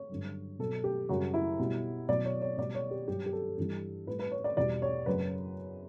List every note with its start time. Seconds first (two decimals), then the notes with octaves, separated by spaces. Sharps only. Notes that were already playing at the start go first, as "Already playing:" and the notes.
Already playing: C#5
0.09 G2 D3 F#3
0.59 B2 F#3 A4
0.84 G4
1.09 F#2 C#3 G3 F#4
1.34 E4
1.59 B2 G3
2.09 B2 F#3 D5
2.25 C#5
2.42 C#5
2.58 B2 G3 D5
2.75 C#5
2.91 G4
3.08 G2 F#3 G4
3.26 G4
3.33 A4
3.58 G2 E3 G3
4.07 A2 G3 B4
4.19 B4
4.31 C#5
4.44 D5
4.57 E2 B2 G3 D5
4.82 C#5
5.06 F#2 C#3 F#3 B4